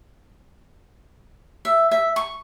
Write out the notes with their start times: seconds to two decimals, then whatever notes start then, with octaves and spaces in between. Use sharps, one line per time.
1.65 E5
1.91 E5
2.16 C#6